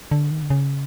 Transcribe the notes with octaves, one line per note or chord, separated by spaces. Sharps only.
D3
D#3
D3
C#3